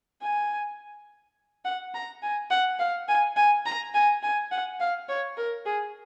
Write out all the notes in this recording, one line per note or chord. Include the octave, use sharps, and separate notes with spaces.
G#5
F#5
A#5
G#5
F#5
F5
G#5
G#5
A#5
G#5
G#5
F#5
F5
C#5
A#4
G#4